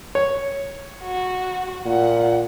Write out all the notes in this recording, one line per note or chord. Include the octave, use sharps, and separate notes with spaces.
C#5
F#4
A#2 F#5